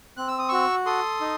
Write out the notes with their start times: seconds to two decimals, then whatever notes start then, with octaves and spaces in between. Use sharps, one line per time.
0.17 C4 F#6
0.28 E6
0.39 D#6
0.49 F#4 C#6 E6
0.86 A4 C6 D#6
1.21 D#4